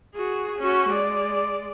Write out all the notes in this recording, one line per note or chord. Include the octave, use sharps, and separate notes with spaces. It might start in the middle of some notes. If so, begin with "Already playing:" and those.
F#4 G#4
C#4 F#4
G#3 D5